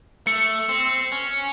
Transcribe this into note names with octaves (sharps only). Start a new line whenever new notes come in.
A3 C#7
C4
C#4